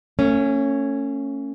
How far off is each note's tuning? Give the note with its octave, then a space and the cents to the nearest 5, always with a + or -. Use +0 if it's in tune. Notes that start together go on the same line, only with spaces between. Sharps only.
A3 +45 C#4 -5